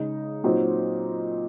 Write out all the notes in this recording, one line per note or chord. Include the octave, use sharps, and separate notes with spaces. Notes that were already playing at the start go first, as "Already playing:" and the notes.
Already playing: C#3 G#3 D#4
A#2 F#3 C4 D#4